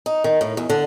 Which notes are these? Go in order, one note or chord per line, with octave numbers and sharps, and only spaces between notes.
D#4
D#3
A2
E2
D3